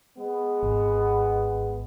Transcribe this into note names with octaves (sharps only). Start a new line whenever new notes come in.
G#3 B3
G#1